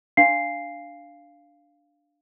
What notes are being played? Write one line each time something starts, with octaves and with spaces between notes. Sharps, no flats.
D4 F5 C7